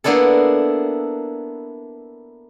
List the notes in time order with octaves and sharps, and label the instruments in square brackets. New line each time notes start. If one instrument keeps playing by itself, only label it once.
[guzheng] A#3 B3 D4 E4 A4